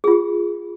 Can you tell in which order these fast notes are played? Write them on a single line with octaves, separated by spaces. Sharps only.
G#4 F4 G4